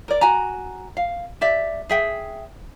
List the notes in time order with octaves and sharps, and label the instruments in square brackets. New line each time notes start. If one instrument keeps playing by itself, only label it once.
[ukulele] A#4 D5
F#4 G#5 A#5
F5
G4 D5 E5
G#4 E5 G5